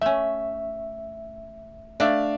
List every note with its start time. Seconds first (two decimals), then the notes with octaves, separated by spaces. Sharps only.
0.02 A3 C#4 E5
2.00 A3 D4 D5 E5 F5